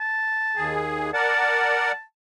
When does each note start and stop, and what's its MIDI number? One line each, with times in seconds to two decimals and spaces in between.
0.01 0.75 81
0.56 1.11 39
0.56 1.11 68
1.14 1.92 70
1.14 1.92 74
1.14 1.92 78
1.14 2.02 81